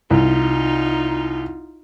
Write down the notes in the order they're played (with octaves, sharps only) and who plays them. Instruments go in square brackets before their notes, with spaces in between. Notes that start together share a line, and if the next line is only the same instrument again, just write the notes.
[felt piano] C2 [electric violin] D#4 F4